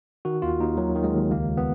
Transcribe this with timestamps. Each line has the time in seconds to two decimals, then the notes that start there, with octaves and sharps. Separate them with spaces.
0.25 D#3 F#4
0.42 D#2 F4
0.60 D#2 D#4
0.77 D#3 F#3
0.96 D#3
1.04 G#3
1.13 D#2
1.31 C#2 A#3
1.48 C#2
1.57 B3